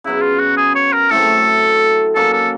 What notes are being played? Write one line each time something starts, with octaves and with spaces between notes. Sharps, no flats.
C#3 F#3 B3 E4
F4
F#4
G#4
C#5
A#4
A2 F#3 A3 C4 A4
F#3 A#3 C#4 A4
A4